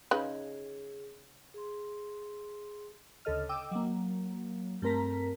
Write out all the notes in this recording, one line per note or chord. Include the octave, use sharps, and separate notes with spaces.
C#3 D#4 G#4 B4
G#4 C6
D2 C#3 A4 D#5 F6
D#5 G5 D6 E6
F#3 A#3
G2 A3 C4 A#4 A#5 B6